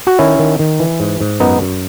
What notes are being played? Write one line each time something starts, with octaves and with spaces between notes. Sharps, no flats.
F#4
D#3 C#4 E4
D#3
D#3
E3
G#2
G#2
F#2 B3 D#4
F#2